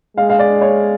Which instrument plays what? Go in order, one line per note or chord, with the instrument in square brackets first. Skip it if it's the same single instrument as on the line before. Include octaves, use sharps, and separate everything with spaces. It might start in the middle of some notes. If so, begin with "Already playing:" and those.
[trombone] G#3 [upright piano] F5
[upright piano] F5
D5
C#5